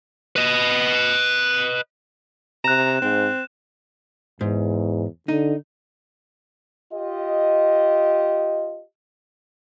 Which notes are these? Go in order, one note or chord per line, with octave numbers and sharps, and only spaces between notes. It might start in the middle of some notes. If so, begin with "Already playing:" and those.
B4 D#5
C3 A#5 F#6 E7
G#2 C4
E2 G#2
D3 D#4
F4 G4 D#5